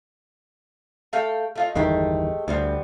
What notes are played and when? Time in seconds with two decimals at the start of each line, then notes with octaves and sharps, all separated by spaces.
1.13 A3 F5 G5
1.55 A3 F4 D#5
1.75 G1 E2 D#3 G#3 A3 G4
2.48 D2 G3 B3 C4